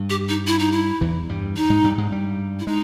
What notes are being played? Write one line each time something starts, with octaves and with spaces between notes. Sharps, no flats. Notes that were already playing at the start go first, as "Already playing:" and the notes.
Already playing: G2 G3
G4
D#4
E4
D#4
E4
E2 E3
G2 G3
D#4
G#2 G#3
G2 G3
G#2 G#3
G2 G3
E4
G#3 D#4